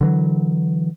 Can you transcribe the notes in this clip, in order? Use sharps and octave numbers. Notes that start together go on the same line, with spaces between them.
D3 E3 F#3